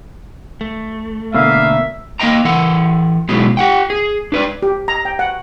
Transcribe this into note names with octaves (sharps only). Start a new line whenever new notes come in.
A3
B2 D3 A#3 E5 F5
A#3 C4 D#5 G5 A#5
E3 A4 F#5
B2 F#3 G#3 B3 G#4
G4 F#5 G5
G#4
D4 B4 D5
G4
A#5
G5
F#5